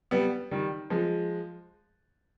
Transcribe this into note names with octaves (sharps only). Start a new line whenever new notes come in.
G3 B3
D#3 G3
F3 G#3